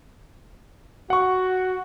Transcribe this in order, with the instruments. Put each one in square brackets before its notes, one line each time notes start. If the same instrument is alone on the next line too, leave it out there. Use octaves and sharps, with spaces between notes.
[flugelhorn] F#4 [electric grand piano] F#5 C#6